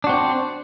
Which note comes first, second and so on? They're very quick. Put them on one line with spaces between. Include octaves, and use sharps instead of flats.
D4 F#4 C4